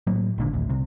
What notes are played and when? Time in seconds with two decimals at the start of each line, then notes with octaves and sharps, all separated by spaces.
0.07 A2 F#3 A#3
0.38 G#1 A#2 D3
0.53 D#1 A1 D2
0.69 C2 C3